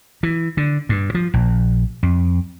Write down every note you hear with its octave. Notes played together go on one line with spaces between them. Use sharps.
E3
D3
G2
F3
A#1
F2